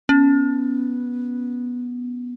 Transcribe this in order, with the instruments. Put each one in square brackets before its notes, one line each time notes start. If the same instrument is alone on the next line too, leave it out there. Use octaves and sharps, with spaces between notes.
[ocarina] B3 [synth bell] C#4